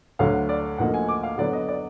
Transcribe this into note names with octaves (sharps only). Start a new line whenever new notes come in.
D2 D3 F#3 F5
D5
D2 D3 F3 A#3 D#4 F#5
G#5
D6
F5
D3 F#3 B3 D5
D#5
D5